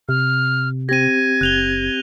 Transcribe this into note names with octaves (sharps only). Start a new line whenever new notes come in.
C3 F6
C4 G4 G#6 A#6 D#7
F#1 F#6 F7 G7